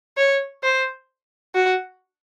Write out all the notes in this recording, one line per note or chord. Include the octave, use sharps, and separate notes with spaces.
C#5
C5
F#4